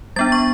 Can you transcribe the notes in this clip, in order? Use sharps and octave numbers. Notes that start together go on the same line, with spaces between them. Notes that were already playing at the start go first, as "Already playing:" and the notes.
G3 B3 D4 A6
C#6